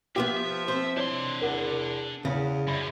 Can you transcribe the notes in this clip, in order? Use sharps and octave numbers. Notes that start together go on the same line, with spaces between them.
F3 B3 F4 G4 E5
C4 C5
D4 E4 C#5 D5 C6
E2 A#4 F#5
E2 C#3
F#2 D5 E5 B5